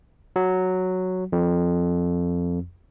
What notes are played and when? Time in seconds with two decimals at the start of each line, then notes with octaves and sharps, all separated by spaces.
0.36 F#3
1.32 F2